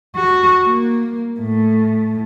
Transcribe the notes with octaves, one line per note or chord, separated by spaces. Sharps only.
F#4
A#3
A2